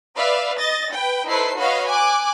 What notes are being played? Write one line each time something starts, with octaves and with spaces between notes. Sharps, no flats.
B4 D5 E5 F5
D#5 A6 A#6
B4 G5
D#4 E4 A4 B4 C5 C7
F#4 B4 C#5 D#5 F5
G#5 D6 F#6